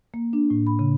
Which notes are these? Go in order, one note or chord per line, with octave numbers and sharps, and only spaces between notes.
A#3
D4
A2
B5
C#3